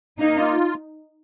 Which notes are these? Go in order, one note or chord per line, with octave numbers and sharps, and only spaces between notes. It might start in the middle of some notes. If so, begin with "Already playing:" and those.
A#3 D#4
F4